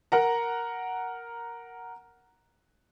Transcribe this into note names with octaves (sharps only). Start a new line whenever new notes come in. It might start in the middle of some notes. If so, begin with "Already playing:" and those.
A#4 F#5 A#5